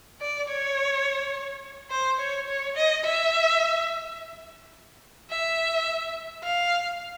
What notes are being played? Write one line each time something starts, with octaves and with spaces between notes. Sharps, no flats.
D5
C#5
C5
C#5
C#5
D#5
E5
E5
F5